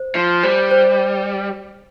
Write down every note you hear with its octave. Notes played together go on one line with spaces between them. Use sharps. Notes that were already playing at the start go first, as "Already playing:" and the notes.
Already playing: C5
F3 F5
G3 C5
C5